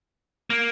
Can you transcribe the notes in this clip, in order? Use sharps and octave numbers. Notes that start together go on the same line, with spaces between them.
A#3